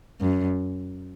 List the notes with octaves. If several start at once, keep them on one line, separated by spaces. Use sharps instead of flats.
F#2